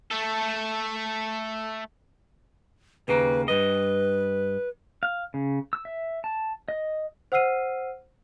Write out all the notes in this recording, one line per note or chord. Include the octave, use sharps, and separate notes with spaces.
A3 A4
D#2 C#3 A#3 B4
G2 B4 D#5
F5
C#3
E6
E5
A5
D#5
C5 F#5 E6 F6 C7 D#7